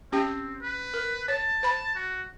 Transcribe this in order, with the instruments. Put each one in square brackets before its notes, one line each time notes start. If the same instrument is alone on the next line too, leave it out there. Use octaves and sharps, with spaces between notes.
[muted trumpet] C4 [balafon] C#4 G4 G5
[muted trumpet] B4
[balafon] A#4
[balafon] C#5 [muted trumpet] A5
[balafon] C5 B5
[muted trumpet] F#4